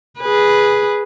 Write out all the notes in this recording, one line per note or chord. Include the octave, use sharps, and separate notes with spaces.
G#4 B4